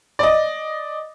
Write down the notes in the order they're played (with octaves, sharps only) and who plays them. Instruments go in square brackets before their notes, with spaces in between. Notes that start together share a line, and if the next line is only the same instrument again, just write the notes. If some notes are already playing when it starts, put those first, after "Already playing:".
[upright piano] D5 D#5